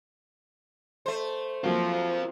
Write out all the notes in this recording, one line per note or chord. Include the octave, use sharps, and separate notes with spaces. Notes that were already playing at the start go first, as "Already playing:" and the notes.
A3 C5
F3 F#3 A#3 C4 F4